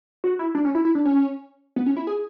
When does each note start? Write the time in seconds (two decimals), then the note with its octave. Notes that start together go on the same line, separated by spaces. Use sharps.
0.24 F#4
0.39 E4
0.55 D4
0.65 C#4
0.75 E4
0.85 E4
0.95 D4
1.05 C#4
1.76 B3
1.86 C#4
1.97 E4
2.07 G#4